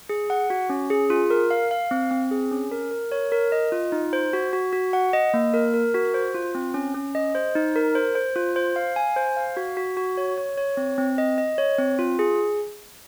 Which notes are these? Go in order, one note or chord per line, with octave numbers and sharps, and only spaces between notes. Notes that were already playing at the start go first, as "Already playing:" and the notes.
G#4
F#5
F#4
C#4
G#4
F4
A#4
F5
F5
C4
C4
G#4
C#4
A#4
A#4
C#5
A#4
D#5
F4
D#4
C5
F#4
F#4
F#4
F#5
D#5
A#3
A#4
A#4
F#4
C5
F4
C4
C#4
C#4
D#5
C5
D#4
A#4
C5
C5
F4
C5
F5
G#5
C5
F5
F#4
F#4
F#4
C#5
C#5
C#5
C4
C4
D#5
D#5
C#5
C4
F4
G#4